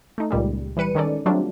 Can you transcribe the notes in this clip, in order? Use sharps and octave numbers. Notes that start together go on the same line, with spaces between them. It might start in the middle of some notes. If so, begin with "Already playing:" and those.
A3 D#4
C#2 A#2 G3 G#3
E3 G3 B4 C#7 D#7
D#3 G#3 C#4 D#4 A4 D5
F#3 G3 A3 C4 D4 F4